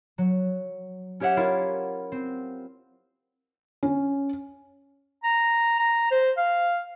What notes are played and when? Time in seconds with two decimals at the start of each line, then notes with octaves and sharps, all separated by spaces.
0.18 F#3
1.20 C#4 G4 C#5 E5 F#5
1.37 E4 F4 A#4 F5
2.12 C4
3.83 C#4
5.24 A#5
5.79 A#5
6.11 C5
6.37 F5